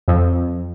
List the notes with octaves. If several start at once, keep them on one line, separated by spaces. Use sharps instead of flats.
F2